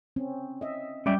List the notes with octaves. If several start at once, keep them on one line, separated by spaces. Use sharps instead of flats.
C4 C#4
D#5 E5
G3 C#4 G4 D5 E5 D6 G6